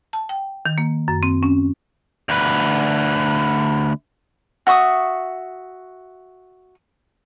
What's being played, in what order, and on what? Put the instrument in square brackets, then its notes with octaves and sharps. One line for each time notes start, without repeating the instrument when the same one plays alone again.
[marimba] A5
G5
D#3
A#3
F#2
C4
C#4
[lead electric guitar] D2 B4
[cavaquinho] F#4 E5 C#6 D#6